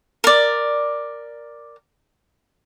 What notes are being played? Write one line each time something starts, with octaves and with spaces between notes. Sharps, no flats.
A#4 D5